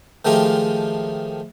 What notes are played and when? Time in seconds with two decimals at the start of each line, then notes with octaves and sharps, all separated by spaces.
0.25 D#3 F3 G#3 A3 F4 G4